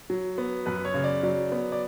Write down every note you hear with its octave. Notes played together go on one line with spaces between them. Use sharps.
F#3
B3
F#2 B4
C#5
C#3
D5
F#3 D5
B3
D5